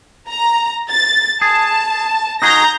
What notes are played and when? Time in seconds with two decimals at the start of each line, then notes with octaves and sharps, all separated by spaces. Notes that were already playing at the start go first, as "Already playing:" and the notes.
0.28 A#5
0.90 A6
1.42 G#4 A5
2.42 D#4 F#4 G#4 A#5 G6 A#6